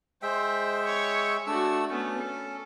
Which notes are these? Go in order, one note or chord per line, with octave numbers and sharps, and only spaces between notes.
G#3 C5 E5 G5
C#5
A3 D4 F#4 E6
A3 B3 C#4
A4